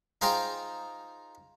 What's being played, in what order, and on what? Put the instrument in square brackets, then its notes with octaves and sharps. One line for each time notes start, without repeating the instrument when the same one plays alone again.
[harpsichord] D#4 F4 G#4 C5 G5 A#5